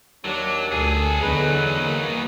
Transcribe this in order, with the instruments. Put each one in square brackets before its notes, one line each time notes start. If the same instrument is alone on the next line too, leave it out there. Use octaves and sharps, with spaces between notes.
[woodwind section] D#2 D4 [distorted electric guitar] F#3
[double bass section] D2 [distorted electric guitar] G#4 A4
[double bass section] E2 D3 [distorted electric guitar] F#3 D#4 [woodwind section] G#4 B4
[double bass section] A#3